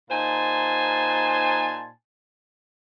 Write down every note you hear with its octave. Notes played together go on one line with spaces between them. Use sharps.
A#2 D#4 C5 G#5 A5 C6